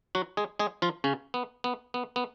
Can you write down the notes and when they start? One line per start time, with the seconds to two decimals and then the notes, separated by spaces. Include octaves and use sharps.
0.15 F#3 F#4
0.37 G#3 G#4
0.59 G#3 G#4
0.82 F3 F4
1.04 C#3 C#4
1.34 B3
1.64 B3
1.94 B3
2.16 B3